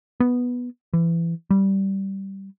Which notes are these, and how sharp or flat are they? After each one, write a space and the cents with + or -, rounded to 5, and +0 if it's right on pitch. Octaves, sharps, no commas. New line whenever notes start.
B3 -5
E3 +25
G3 -10